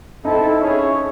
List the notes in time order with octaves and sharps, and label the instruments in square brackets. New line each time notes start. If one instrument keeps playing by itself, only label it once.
[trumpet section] C4 E4 A4 [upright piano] D#4
[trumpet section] C#4 E4 G#4 C#5